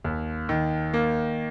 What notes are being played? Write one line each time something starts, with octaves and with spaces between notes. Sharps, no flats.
D#2
D#3
A#3